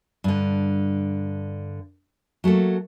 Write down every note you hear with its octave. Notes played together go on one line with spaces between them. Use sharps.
G2 D3
F#3 A3 A#3 A4